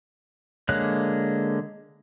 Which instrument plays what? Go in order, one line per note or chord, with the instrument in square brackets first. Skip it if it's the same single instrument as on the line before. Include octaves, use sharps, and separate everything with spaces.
[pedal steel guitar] D3 G#3 A#3 C#5 F#6